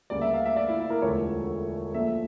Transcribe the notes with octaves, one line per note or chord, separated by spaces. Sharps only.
D2 C#3 G3 A#3 D5
E5
F5
E5
D5
E4
E4
A#4
E1 D2 D3 F3 A3 C#5
A#1 A#2 F3 A3 E5